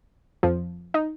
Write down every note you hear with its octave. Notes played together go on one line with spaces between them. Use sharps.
F2 F3
D#4